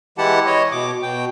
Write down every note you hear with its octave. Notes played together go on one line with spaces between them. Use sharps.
E3 G#3 E4 G4 F#5 A5
C#5 D#5
B2 D6
B2 G5